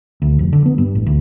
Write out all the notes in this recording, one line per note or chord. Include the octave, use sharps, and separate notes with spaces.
D2
F1
D3
B3
G2
A1
D2